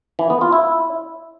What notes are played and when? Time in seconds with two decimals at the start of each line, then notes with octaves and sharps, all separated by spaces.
0.19 E3
0.30 B3
0.41 F4
0.52 E4